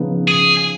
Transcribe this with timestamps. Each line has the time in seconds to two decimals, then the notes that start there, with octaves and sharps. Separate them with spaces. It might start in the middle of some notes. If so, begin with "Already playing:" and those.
Already playing: C#3 F3 B3 D#4
0.28 G#4